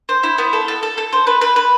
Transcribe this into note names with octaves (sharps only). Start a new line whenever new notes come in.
C5
E4
B3
A4
A4
A4
A4
C5
B4
B4
B4